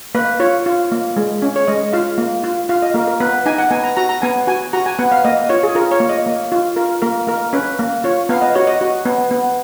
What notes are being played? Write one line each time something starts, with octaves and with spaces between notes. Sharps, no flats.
A#3 B4
F4 C#5
F4
A#3
G#3
C#4
C#5
G#3 D#5
F4 F5
A#3
F4
F4 F5
D#5
A#3 A#4
A#4
B3 B4
D#4 G#5
F#5
B3 G#5
A#5
F#4 A#5
A#5
B3 G#5
F#4 G#5
F#4 A#5
G#5
B3 F#5
F5
A#3 D#5
F4 C#5
G#4
F4 A#4
C#5
A#3
D#5
A#3
F4
F4 A#4
A#3 A#4
A#3 A#4
C#4 B4
A#3
F4 C#5
B3 F5
D#5
F#4 C#5
D#5
F#4
B3
B3